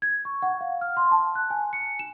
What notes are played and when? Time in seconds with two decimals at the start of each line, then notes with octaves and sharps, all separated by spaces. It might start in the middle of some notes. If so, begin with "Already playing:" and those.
0.02 G#6
0.25 C#6
0.42 F#5
0.61 F5
0.81 F6
0.97 C6
1.11 A5
1.35 F#6
1.50 G#5
1.73 C#7
1.99 E7